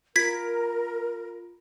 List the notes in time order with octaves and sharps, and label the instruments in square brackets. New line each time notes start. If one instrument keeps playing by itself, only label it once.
[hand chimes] F4 D7 [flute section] A#4 [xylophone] G#6 B6